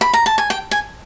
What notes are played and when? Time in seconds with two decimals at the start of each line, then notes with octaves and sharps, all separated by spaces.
0.01 B5
0.13 A#5
0.26 A5
0.38 G#5
0.50 G5
0.71 G#5